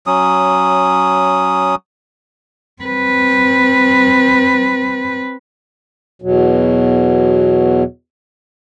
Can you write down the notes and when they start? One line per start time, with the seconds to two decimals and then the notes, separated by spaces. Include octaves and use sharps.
0.07 F#3 C#4 D#6
2.82 C4 B4
6.22 E2 B2 F#3